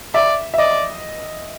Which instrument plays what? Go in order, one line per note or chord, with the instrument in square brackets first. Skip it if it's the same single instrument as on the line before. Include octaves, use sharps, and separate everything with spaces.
[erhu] D5 [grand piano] E5
[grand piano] E5
[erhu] D5 [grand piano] D#5